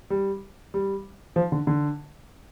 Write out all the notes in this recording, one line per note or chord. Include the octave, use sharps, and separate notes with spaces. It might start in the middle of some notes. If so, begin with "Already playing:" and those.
G3
G3
F3
D3
D3